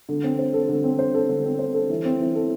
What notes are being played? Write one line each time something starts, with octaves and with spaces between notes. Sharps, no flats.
D3
C4
C5
A4
D3
C4
C5
A4
D3
C4
C5
A4
E3
C4
E3
A4